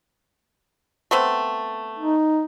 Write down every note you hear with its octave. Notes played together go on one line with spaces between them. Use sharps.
A3 B3 C4
D#4